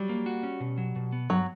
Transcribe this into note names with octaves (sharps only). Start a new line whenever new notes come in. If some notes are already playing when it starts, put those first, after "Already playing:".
Already playing: F#3 G3
A#3
F#4
C#4
B2
F#3
B2
B3
G2 F#3